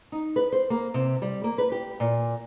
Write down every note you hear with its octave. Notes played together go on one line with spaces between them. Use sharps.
D#4
B4
C5
A#3
C3
G3
A#3
B4
G4
A#2